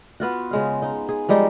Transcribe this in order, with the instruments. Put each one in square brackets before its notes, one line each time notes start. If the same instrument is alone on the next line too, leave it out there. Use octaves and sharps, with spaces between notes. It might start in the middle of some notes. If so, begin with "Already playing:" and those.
[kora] B3 F4 F#4
C#3 G#3 F5
D#4
G#4
F3 G3 G#3 D#4